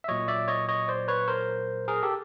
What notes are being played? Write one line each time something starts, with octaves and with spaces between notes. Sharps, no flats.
E5
A#2 F#3 C#5 D#5
D5 E5
C#5 D#5
C#5 D#5
C5 D5
B4 C#5
A#4 C5
G#4 A#4
G4 A4